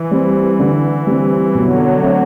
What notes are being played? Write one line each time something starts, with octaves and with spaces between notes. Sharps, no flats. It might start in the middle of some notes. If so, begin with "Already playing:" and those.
Already playing: E3
G3 C4
D3
G3 C4
B2 D3 F#3
A3 C4